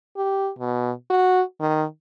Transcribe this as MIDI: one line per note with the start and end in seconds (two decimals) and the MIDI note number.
0.17 0.50 67
0.59 0.91 47
1.10 1.42 66
1.61 1.84 51